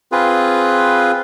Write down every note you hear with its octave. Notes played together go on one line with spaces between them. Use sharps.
C4 F4 G#4 B4